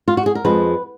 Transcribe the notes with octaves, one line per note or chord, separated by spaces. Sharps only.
F4
F#4
G#4
A#4
F2 F3 G#3 B4